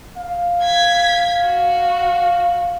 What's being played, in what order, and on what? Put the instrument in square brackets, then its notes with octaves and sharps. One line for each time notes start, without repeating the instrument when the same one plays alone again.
[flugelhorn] F5
[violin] G#6 B6
F#4